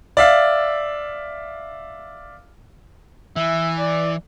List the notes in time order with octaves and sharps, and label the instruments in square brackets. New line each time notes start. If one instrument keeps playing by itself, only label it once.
[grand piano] D5 E5 F5
[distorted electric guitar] E3 [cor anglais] E5
[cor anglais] D5